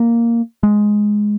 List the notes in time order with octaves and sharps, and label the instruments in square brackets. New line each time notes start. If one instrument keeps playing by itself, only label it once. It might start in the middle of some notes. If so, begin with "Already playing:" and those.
Already playing: [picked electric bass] A#3
G#3